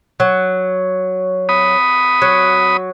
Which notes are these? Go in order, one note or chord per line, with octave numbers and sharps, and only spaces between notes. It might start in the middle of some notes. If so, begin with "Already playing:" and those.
F#3
B5 D#6
F#3